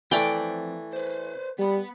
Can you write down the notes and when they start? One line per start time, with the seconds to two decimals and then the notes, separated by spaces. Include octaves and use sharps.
0.12 F2 E3 A3 D5 G5
0.93 B4 C5
1.59 G3 B3 B5